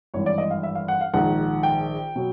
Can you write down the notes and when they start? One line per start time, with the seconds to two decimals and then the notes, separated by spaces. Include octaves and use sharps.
0.14 G#1 G2 E3 C#5
0.26 D5
0.38 D#5
0.51 F5
0.63 E5
0.75 F5
0.88 F#5
1.01 F5
1.14 A#1 G#2 D#3 F#5
1.63 G5
2.16 B2 F#3